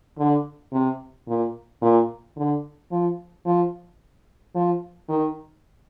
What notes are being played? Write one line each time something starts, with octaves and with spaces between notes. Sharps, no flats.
D3
C3
A#2
A#2
D3
F3
F3
F3
D#3